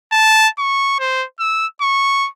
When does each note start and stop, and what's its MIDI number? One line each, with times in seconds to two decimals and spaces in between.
0.12 0.48 81
0.59 0.98 85
1.00 1.25 72
1.40 1.67 88
1.82 2.28 85